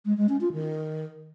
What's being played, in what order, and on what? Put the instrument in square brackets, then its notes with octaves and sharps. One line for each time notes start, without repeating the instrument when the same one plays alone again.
[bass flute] G#3
G#3
C#4
F4
D#3